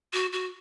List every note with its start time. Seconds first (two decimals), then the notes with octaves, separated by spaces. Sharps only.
0.13 F#4
0.33 F#4